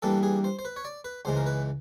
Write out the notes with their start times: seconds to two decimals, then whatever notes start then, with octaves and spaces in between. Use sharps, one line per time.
0.02 G2 E3 G3 A#3 A4
0.23 G#4
0.44 C5
0.59 C5
0.65 B4
0.76 C#5
0.85 D5
1.04 B4
1.25 C#2 C#3 E3 G#3 C5
1.37 A#4
1.46 B4